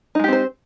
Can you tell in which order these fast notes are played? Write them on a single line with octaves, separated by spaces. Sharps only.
D#4 G#3 G4 C4 C5